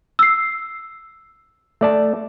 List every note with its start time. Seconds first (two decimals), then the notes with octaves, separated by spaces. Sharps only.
0.19 E6 C7
1.81 A3 D5 A5